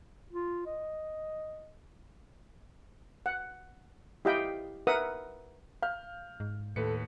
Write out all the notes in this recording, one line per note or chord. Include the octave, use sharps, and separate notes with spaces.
F4
D#5
F#5
E4 G4 D#5 F5 G5 B5
A#4 B4 E5 F#5 D#6
F5 F6 G6
G#2
D#2 A2 A4 B4 C#7